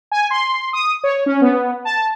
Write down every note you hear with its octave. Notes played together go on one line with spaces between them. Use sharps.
G#5
C6
D#6
C#5
C#4
B3
A5